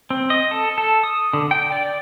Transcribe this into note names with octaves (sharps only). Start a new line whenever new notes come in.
C4
D#5
A4
A4
D#6
D3
G5
D5